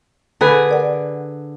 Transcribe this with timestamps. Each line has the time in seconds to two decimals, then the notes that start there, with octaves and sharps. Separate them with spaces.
0.41 D3 G#4 B4
0.69 A#4 D5 F#5